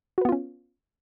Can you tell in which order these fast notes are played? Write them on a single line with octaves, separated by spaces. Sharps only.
F#4 B4 B3 F4 C#4